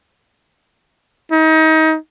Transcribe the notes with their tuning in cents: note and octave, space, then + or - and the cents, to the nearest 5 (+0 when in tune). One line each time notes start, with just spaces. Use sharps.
D#4 +30